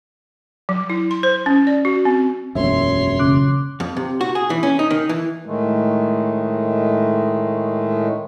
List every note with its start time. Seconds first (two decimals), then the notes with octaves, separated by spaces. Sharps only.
0.69 F#3
0.90 E4
1.11 C6
1.23 C5
1.46 C#4
1.67 D5
1.85 F#4
2.05 C4
2.55 E1 A#1 F#2 C#5 E5 C6
3.19 C#3 D6 F#6
3.80 F2
3.97 C3
4.21 F#4
4.35 G#4
4.50 E3
4.63 C#4
4.79 D#4
4.91 D#3
5.09 E3
5.46 A2 D#3 G#3 A3